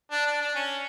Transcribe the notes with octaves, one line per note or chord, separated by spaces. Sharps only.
D4
D4
D4
C#4